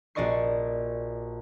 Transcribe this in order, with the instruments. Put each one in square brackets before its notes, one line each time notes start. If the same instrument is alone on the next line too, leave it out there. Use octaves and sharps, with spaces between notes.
[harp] A#1 F#4 D5 D#5 C#6 C7